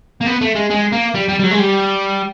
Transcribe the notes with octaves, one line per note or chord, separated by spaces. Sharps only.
A#3
B3
A3
G#3
G#3
A#3
G3
G3
G3
F#3
G#3
G3